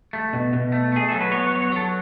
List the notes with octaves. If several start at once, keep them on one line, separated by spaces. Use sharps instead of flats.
A3
B2
B2
A3
A3 G#4
F#3 A4
B4
B3 C#5
C#5
F#3
C#5
F#3 A4